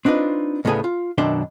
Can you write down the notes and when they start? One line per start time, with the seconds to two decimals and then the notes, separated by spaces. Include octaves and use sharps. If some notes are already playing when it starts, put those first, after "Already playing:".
0.05 C4 D4 D#4 F4 B4
0.65 D2 A2 C#3 B3 G#4 G#5
0.84 F4
1.18 F#2 B2 D#3 D4 E5 C6